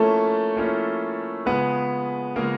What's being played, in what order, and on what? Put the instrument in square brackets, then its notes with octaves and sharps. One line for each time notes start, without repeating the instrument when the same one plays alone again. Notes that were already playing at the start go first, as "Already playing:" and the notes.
Already playing: [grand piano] F3 A3 A#3 C#4 E4 A4
F3 A#3 C#4 E4
C#3 F3 G#3 B3 B4
C#3 F3 G#3 A#3 A#4